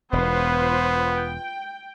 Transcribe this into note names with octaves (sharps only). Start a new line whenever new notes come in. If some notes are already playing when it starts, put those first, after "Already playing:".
E1 B3 F4 B4 C5
G5